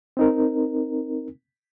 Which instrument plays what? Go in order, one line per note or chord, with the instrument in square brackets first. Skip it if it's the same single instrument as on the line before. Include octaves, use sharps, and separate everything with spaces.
[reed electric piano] C4 D#4 A#4